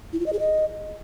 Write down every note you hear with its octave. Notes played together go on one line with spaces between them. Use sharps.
E4
F4
D#5
G#4
D#5